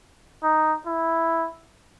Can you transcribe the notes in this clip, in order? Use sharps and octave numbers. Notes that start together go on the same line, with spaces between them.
D#4
E4